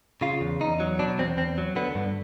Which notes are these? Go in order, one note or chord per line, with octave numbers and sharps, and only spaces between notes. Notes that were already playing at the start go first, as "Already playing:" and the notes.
C#3 F4
E2
E2 D#4
F#3
B2 D4
E2 C4
E2 C4
F#3
D3 B3
G2